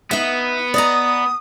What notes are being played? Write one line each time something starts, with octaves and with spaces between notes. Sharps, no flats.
B3 D#4 E5
D5 D#5 A#5 D#6